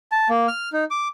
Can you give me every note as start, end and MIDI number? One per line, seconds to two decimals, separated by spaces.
0.12 0.28 81
0.29 0.47 58
0.48 0.69 89
0.73 0.84 63
0.91 1.08 86